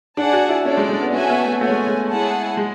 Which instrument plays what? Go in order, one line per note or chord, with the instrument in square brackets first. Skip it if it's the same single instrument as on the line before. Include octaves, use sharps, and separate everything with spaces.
[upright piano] D4 [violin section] G#4 D5 F#5 A5
[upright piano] F#4
E4
[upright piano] C#4 [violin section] D4 A4 D5
[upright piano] G#3
G#3
B3
[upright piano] C#4 [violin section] F#4 A4 E5 G#5
[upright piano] B3
A3
[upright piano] A3 [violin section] F#4 C#5 G#5
[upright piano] G#3
G#3
[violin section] E4 G#4 C#5 F#5 A5
[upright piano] G#3